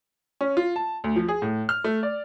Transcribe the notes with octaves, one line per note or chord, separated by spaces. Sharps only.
C#4
F4
A5
D2
F3
G#4
A2
F6
A3
D5